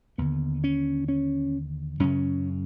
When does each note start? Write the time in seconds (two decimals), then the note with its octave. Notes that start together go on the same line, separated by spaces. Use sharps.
0.18 D#2 D3 B3
0.64 C#4
1.08 C#4
2.00 F#2 C#3 C#4